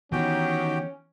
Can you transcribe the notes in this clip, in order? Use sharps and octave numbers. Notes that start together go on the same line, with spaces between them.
D#3 E3 B3 C#4 F#4 G4 G5